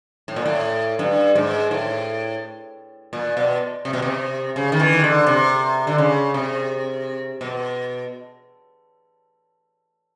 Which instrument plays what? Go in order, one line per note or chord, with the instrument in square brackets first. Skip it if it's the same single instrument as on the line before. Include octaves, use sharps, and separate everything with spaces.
[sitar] A2
A#2
A2
G2
G#2
A2
A#2
B2
C3
B2
C3
C#3
D#3
E3
D#3
D3
C3
D3
C#3
C3
B2